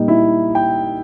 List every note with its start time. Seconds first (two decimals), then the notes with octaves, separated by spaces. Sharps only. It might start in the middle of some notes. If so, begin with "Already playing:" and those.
Already playing: A#2 G3 A#3 D#4
0.08 E4
0.55 G5